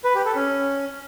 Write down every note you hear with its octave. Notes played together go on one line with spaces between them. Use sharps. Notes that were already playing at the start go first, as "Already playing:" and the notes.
B4
G4
A4
C#4